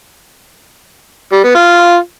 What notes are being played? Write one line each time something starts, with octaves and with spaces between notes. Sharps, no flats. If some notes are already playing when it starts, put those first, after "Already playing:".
G3
B3
F4